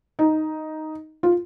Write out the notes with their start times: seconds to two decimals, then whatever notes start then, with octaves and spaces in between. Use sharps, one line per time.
0.19 D#4
1.23 F4